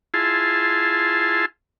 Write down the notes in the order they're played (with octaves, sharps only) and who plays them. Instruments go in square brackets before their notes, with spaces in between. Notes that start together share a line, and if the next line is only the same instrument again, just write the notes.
[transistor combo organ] E4 F4 G#4 A5 C6